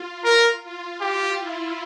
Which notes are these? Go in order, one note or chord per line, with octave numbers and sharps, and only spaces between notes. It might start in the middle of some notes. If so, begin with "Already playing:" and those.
Already playing: F4
A#4
F4
F4 G4
E4